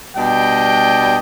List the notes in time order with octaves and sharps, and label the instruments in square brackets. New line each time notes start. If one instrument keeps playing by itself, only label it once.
[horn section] B2 G3 D4 D5 D#5 G5